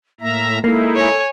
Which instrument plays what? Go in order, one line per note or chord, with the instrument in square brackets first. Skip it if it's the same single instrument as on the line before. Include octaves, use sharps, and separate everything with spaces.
[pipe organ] A2 E5 A#5 [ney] A#3
[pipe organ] G#3 D#4 E4 [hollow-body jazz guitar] A#3 [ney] A4
[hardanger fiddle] C#5 G#5